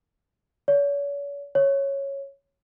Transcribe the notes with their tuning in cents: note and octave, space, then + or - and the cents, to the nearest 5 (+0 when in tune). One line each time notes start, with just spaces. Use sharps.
C#5 +40
C#5 -5